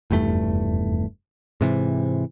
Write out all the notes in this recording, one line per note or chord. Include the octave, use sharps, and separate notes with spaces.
F1 E2 G2 A3
G#2 C3 E3